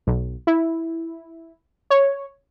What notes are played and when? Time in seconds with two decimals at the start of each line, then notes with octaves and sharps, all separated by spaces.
0.07 B1
0.47 E4
1.90 C#5